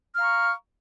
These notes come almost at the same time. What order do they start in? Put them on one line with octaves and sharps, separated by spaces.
F6 F5 A#5 C#6